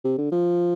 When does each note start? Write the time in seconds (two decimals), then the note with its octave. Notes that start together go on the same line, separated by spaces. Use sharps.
0.04 C3
0.18 D3
0.32 F3